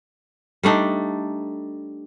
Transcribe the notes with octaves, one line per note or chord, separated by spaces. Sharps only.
G3 A3 D4 D#4